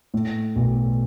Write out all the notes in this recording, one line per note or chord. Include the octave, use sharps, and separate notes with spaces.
A2
B1